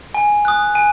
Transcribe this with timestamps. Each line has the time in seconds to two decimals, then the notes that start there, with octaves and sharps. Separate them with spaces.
0.14 G#5
0.45 D#6 F#6
0.75 G#5 D#7